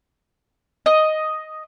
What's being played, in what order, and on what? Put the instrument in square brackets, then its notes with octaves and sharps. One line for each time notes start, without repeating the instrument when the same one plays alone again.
[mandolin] D#5